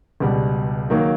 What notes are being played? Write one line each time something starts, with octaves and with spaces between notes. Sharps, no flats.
C#2 B2 G3
D#3 F#3 A#3